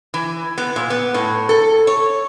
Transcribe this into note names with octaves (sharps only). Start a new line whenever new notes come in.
E3
B3
A#2
B3
A2
A4
C#5